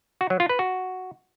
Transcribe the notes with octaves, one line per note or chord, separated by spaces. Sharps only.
F#4
F#3
F4
B4
F#4